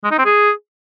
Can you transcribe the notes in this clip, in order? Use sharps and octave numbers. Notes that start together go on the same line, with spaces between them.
G#3
D#4
C4
G#4